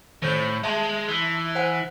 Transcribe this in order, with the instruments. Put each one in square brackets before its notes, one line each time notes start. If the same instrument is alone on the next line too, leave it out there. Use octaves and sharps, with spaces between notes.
[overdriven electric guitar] A2 [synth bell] D#3 C5 G6
[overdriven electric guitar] G#3 [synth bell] E5 A5 C6
[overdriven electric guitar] E3
[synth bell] C5 F#5 G#5